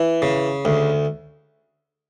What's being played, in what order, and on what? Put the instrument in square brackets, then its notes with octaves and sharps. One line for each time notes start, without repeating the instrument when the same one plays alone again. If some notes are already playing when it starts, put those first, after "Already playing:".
Already playing: [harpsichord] E3
C#3
D2